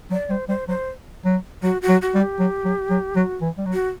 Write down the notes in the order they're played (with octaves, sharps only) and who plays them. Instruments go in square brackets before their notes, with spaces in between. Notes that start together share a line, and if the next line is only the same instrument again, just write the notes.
[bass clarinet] F#3 [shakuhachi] D5
[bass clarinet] G3 [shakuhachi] C5
[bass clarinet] G3 [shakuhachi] C5
[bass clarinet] F#3 [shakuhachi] C5
[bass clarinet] F#3
[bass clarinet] F#3 [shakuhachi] F#4
[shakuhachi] F#4
[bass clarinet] F#3
[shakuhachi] F#4
[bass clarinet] G3
[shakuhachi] G4
[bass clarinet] F#3
F#3
F#3
[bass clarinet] F#3 [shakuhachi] F#4
[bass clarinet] E3
G3
F#3
[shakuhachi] F#4